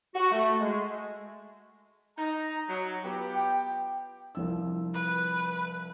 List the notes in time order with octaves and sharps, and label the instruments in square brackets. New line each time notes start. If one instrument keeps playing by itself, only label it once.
[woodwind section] F#4
A3
G#3
[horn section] D#4 A#5
F#3
B3 F4 G4
[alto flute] G5
[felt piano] C2 F3 E6
[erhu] B4